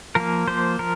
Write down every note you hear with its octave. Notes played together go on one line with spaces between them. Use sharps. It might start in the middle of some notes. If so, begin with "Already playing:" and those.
F3 A#3 A#4
F3 A#3 C5
F3 A#4